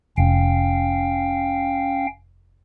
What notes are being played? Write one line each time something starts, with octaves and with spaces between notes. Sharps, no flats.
F1 C#4 F5 G5